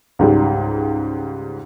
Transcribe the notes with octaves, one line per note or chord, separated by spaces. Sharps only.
C#2 G#2 G3